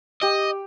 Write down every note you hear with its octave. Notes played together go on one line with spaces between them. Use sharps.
G4 D#5